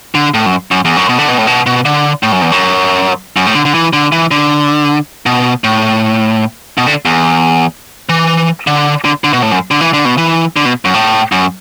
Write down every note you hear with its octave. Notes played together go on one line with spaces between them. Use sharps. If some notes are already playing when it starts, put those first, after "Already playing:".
D3
A2
F#2
F#2
E2
F#2
B2
D3
B2
A2
B2
B2
D3
A2
F#2
E2
F#2
F#2
A2
D3
D3
E3
D3
E3
D3
B2
A2
B2
D3
E2
E3
D3
D3
D3
B2
A2
F#2
D3
E3
D3
B2
E3
D3
B2
F#2
A2
F#2